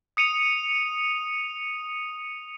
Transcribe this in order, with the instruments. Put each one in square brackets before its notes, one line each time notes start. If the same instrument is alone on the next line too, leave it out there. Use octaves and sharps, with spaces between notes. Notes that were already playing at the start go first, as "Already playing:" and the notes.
[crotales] D#6 C#7 D#7 F7